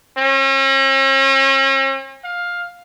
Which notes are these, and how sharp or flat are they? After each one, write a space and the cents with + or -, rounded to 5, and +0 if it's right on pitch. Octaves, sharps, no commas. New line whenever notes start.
C#4 -40
F5 +10